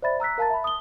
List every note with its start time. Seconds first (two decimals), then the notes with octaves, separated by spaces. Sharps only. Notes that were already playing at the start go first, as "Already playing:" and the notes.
0.02 C5 D5 E5 B5 A6
0.20 A#5 E6 F#6 B6
0.38 A#4 F5 A5 A#5 A6
0.50 E5 B5
0.64 D#6 G7